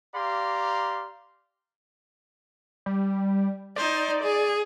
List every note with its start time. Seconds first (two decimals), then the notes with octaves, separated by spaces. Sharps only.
0.15 G4 D5 F5 A#5 C6
2.86 G3
3.76 D#4 C5 D5
4.23 G#4